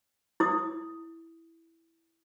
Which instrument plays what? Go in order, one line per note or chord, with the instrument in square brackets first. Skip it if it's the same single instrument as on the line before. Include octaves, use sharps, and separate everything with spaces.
[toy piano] E4 D#6